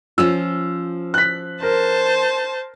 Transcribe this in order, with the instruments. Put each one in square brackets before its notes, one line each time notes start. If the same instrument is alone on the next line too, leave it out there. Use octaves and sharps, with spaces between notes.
[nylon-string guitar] F3 C#4 F4 [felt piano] E6
[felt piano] F#6 B6
[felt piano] A#4 [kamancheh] C5 A5